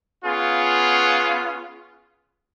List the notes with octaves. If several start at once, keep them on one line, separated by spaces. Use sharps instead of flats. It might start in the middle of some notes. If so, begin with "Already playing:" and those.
B3 C#4 F4 G#4